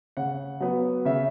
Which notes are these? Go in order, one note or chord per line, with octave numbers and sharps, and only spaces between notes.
C#3 F#5
F#3 B3
C#3 E5